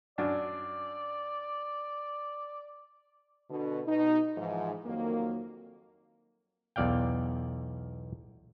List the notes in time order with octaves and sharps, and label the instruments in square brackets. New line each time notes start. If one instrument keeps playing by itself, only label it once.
[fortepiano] F#2 D4 [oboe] D5
[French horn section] B2 D3
B2 D#4
G#2 E3 F3
F2 D#3 F#3 A#3
[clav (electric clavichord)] B1 E2 D5 F5 G5